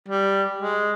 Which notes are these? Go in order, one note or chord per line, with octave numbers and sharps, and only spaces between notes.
G3
G#3